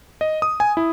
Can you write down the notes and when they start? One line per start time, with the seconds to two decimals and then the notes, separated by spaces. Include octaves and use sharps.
0.21 D#5
0.42 D#6
0.60 G#5
0.77 E4